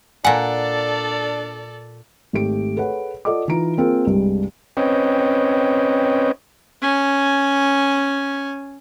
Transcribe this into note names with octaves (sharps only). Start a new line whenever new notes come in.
A#2 D4 A4 D5 F#5 G#5
G#1 A3 G4 D7
G#4 A4 B4 C#5 F#5
F4 A4 D5 D#5 F#5 D6
E3 D#4 F4 A#5 D7
A#3 C4 F4 G#4 A#4
C2 G2 G3 G#3
C4 C#4 B4 C#5 D#5 G5
C#4 G#5